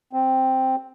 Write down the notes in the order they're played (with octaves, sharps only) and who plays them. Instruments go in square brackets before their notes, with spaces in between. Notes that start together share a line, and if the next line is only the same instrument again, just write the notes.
[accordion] C4